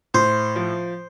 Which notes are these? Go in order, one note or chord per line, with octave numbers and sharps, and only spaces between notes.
A2 C5
F3